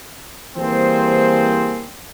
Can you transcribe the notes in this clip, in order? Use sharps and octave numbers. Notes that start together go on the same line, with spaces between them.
E3 G3 A#3 C4 G#4 C5